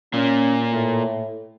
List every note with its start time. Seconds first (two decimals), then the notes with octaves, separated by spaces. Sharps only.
0.14 A#2 A#3 C#4
0.71 A2